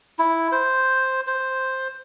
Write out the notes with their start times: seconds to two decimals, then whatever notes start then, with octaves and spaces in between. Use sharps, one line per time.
0.19 E4
0.52 C5
1.27 C5